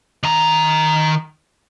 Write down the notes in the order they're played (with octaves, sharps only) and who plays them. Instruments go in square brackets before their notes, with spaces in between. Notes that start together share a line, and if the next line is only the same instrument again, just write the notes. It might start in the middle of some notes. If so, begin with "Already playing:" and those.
[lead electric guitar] D#3 A#5